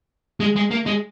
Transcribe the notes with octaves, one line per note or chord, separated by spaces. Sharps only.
G#3
G#3
A#3
G#3